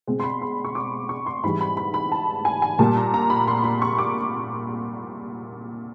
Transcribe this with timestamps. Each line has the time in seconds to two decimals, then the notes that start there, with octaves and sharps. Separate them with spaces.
0.07 B2 G#3 C4
0.20 C6
0.24 B5
0.42 C6
0.65 C#6
0.75 D6
1.09 C#6
1.26 C6
1.44 G#2 E3 G3 B5
1.61 B5
1.77 B5
1.94 B5
2.12 A5
2.45 G#5
2.62 G#5
2.79 A#2 G3 A#3 A5
2.97 A#5
3.14 A#5
3.30 B5
3.48 C6
3.64 B5
3.82 C#6
3.98 D6